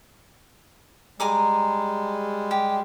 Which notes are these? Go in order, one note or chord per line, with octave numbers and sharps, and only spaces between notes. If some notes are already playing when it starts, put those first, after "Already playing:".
G3 G#3 G#5 A#5 D6
G4